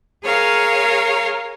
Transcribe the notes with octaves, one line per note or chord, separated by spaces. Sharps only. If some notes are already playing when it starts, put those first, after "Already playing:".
G#4 A#4 C#5 F5